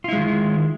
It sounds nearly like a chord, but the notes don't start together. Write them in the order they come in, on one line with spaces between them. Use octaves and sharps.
F4 E4 G#3 D#3